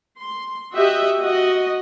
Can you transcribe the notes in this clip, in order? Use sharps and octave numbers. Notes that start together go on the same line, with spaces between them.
C6
F#4 G4 D#5 E5
F#4 D#5